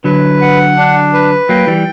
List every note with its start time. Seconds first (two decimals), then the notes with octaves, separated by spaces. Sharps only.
0.04 D3 F#3 B4
0.41 F#5
0.77 D4
1.13 B4
1.49 F#3 A#3 G5
1.67 E3 G3